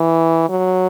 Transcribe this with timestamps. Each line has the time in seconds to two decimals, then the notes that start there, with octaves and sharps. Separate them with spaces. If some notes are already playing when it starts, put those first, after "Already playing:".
Already playing: E3
0.50 F#3